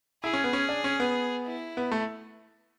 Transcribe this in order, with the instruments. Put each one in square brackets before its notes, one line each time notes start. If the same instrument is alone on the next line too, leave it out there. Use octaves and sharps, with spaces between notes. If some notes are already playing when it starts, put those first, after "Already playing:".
[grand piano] E4 [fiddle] G#4
[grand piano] C#4
B3
C#4
D4
C#4
B3
[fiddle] E4
[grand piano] B3
A3